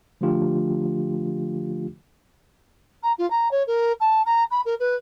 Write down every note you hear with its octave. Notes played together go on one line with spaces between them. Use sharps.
D3 F3 A3 D4 F4 G4
A#5
F4
A#5
C#5
A#4
A5
A#5
B5
A#4
B4